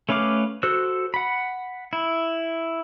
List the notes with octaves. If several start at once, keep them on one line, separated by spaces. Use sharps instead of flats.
A3 C#4 B4 F5 D6
F#4 A4 C5 E6 F#6
F#5 B5
E4